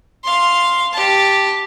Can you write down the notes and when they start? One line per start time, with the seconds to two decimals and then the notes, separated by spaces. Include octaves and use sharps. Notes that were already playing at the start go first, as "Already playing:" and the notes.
0.24 F5 C6
0.93 G4 A5